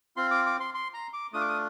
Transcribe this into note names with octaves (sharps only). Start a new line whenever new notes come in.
C4 F4 C6
D6
D6
C6
C6
A#5
D6
A3 D4 F4 D#6
D6
D#6